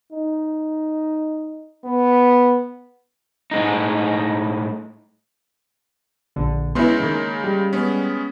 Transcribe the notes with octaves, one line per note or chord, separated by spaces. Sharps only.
D#4
B3
A2 G#3 D#4
A#1 D3
C#3 G#3 B3 E4 C6
D#3 A#3
G3
G#3 B3 C#4